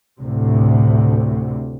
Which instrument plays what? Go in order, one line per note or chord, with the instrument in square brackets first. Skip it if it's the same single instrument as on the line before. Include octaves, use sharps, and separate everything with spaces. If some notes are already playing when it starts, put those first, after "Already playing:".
[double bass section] D2 A2 C3